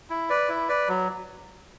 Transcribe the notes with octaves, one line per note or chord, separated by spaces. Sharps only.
E4
B4 D5
E4
B4 D5
F#3